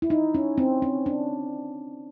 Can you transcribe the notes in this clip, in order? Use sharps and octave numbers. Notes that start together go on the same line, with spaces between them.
E4
D#4
C#4
C4
C#4
D4